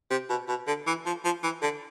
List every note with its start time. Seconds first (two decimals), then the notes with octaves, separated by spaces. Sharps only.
0.10 C3
0.30 B2
0.48 B2
0.67 D3
0.87 E3
1.06 F3
1.24 F3
1.43 E3
1.62 D3